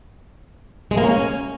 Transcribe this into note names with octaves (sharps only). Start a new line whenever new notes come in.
G#3
A#3
C#4